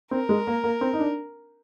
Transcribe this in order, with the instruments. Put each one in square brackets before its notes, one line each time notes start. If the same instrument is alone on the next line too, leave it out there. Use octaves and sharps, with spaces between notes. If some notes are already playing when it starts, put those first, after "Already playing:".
[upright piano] C4 [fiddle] A#4
[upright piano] G#3
A#3
A#3
C4
D#4
D4